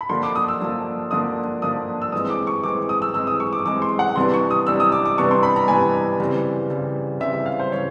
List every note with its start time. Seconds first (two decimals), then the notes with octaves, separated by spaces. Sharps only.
0.01 B5
0.09 D3 F3 A#3 D4 C6
0.23 D6
0.35 D#6
0.48 E6
0.60 D3 F3 A#3 D4
1.11 D3 F3 A#3 D4 D#6
1.62 D3 F3 A#3 D4 D#6
2.02 E6
2.12 E3 G#3 C4 D#6
2.30 D6
2.47 C#6
2.63 E3 G#3 C4 D6
2.89 D#6
3.02 E6
3.14 E3 G#3 C4 E6
3.27 D#6
3.40 C#6
3.53 D6
3.66 E3 G#3 C4 D6
3.82 C6
3.99 F#5
4.16 C3 E3 G3 B3 D4 C6
4.34 C#6
4.51 D#6
4.67 C3 E3 G3 B3 D4 E6
4.80 D#6
4.92 D6
5.05 D6
5.18 C3 E3 G3 B3 D4 C#6
5.31 C6
5.43 B5
5.56 A#5
5.68 C3 E3 G3 B3 D4 G#5
6.20 C#3 E3 G3 C4
6.70 C#3 E3 G3 C4
7.20 C#3 E3 G3 C4 E5
7.33 E5
7.46 F5
7.59 C5
7.72 C#3 E3 G3 C4 C#5